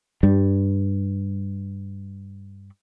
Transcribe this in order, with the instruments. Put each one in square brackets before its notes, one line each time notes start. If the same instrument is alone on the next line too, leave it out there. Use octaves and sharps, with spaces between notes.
[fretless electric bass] G2 G3